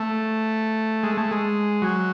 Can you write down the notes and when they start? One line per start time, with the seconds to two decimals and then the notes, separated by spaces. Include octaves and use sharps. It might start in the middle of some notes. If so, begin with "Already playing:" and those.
Already playing: A3
1.03 G#3
1.17 A3
1.31 G#3
1.82 F#3